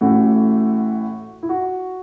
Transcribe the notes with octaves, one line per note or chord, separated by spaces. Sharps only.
A1 A2 E3 A3 F#4
E4
F#4